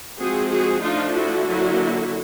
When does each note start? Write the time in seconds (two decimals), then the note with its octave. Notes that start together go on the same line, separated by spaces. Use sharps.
0.19 F3 G#3 C4 F#4 G#4
0.50 F#4 G#4
0.82 F3 A3 D4 D#4 F4
1.14 E4 F#4
1.46 D3 F#3 A#3